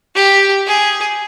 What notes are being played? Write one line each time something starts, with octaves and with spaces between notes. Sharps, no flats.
G4
G#4